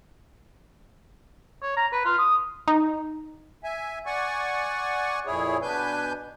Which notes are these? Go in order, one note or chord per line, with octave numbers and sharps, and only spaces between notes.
C#5
A#5
B4
F4
D#6
D#4
E5 G#5
D5 F#5 G#5 C#6
F2 A#2 E4 G#4 C#5
B2 D4 B4 G#5 G6